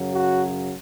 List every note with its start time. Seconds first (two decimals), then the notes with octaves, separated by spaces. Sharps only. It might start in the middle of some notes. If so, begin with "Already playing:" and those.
Already playing: F#2 C#3 F#3
0.12 F#4